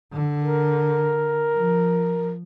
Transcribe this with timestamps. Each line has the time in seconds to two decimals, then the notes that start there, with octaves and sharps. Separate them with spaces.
0.13 D3
0.44 A#4
1.55 F3